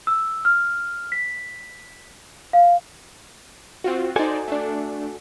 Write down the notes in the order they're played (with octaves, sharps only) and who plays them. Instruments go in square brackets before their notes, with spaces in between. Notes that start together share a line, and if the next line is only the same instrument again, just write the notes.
[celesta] E6
F6
B6
F5
[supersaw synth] C4 F4 F#4
[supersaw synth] D#4 C5 D5 [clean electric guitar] F#4 A4 G#5
[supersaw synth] A3 D4